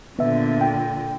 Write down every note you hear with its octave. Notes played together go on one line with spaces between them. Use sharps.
A#2 D3 B3 E5
G5